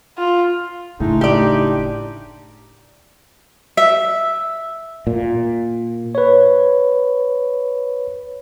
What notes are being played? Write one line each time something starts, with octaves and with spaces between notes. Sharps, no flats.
F4
F#1 A2 C#3 G#3 D4 D#4
A2 G4 D5
E5
A#2
B4 C#5